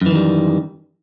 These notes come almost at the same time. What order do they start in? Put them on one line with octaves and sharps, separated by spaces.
F#2 E3 D#3 G3